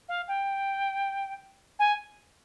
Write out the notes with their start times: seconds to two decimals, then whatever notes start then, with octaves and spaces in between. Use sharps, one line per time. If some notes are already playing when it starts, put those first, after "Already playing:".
0.08 F5
0.28 G5
1.79 G#5